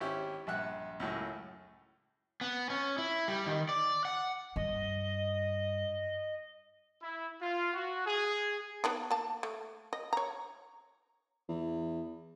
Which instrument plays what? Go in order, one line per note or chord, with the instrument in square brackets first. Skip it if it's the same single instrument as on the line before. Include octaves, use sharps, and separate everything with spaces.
[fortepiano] G#1 C#4 E4 G4
A#1 G2 E5 F#5 F#6
C#2 F#2 A2
[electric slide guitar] B3
C#4
E4
G3
D#3
D5
F#5
[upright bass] G2 [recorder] D#5
[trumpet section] E4
F4
F#4
G#4
[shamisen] B3 D4 D#4
A#3 A5
A3
D#5
C#5 A#5
[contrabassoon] E2